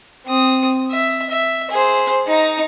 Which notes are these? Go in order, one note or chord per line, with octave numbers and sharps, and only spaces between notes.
C4 D#6
E5
E5
G#4 C5
D#4 A#5